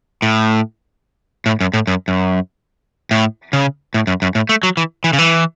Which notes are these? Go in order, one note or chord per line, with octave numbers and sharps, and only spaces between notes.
A2
A2
F#2
A2
F#2
F#2
A2
C#3
A2
F#2
F#2
A2
A3
F#3
E3
E3
C#3
E3